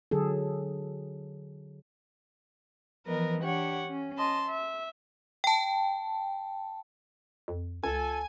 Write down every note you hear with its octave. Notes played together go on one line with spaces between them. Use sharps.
D3 F#3 G#4 A4
E3 F3 B3 A#4 B4 D#5
D4 G4 C#5 F#5 G5
C#4
D#5 A5 C6
E5
G5 A5
F2
C#2 F4 A4 G#5